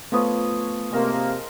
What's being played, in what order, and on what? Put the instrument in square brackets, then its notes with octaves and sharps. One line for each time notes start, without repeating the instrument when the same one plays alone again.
[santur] F3 C#5 D#6 [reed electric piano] A3 B3 B4
[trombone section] C3 A#3 [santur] G#3 A#4 C5